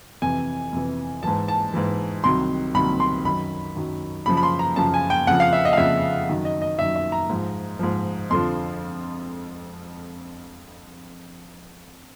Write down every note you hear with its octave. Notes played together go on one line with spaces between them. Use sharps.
F2 C3 E3 G#5
F2 C3 E3
G#2 E3 A5
A5
G#2 E3
C2 C3 D#3 F#3 C6
C2 C3 D#3 F#3 B5
C6
F#2 D#3 F#3 B5
F#2 D#3 F#3
F#2 C#3 F3 B5
B5
C6
A#5
F#2 C#3 F3 A5
G#5
G5
F2 C#3 F3 F#5
F5
E5
D#5
F5
F2 C#3 F3 E5
F#2 D#3 F#3
D#5
D#5
F#2 D#3 F#3 E5
E5
A#5
G#2 F3
G#2 F3
F2 D3 F3 C6